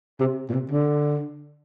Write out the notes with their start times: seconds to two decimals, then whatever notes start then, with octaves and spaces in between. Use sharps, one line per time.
0.20 C3
0.49 A#2
0.53 C3
0.71 D3